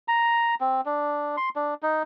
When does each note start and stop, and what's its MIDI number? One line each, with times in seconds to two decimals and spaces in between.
0.08 0.55 82
0.60 0.81 60
0.85 1.36 62
1.37 1.49 84
1.56 1.74 62
1.83 2.03 63